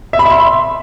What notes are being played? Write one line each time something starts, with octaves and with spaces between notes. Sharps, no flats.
E5
B5
E5
C6